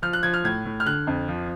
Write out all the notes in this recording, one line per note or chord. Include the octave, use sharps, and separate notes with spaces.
F3 F6
F#6
F3 G#6
F6
A2 G#6
A2
F6
D3 F#6
F2
F3